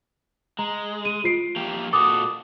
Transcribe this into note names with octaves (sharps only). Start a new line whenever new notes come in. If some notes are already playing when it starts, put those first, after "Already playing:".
G#3 A#5
D#7
F4 C7 D7
F3 A#3 G4
A#2 F#4 A4 D6 D#6